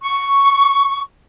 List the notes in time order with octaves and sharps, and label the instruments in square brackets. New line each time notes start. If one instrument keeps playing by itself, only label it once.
[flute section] C#6